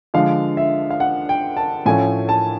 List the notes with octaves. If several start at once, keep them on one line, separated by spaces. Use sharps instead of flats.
D3 F3 G#3 F5
E5
F5
F#5
G5
A5
A2 F3 A3 C#4 G#5
A5